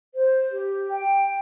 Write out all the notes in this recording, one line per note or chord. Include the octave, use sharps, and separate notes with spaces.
C5
G4
G5